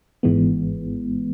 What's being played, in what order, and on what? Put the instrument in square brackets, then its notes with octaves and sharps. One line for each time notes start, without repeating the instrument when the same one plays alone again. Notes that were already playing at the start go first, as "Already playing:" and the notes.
[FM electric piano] G#1 G#2 E3 G#3 B3